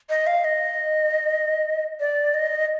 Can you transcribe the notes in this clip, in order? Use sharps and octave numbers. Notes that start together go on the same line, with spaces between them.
D#5
F5
D#5
D5
D#5